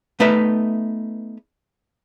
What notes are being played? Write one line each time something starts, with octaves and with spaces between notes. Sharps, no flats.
A3 B3 D#4 B4 E5